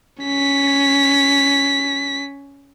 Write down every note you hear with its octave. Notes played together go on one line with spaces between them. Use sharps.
C#4 B6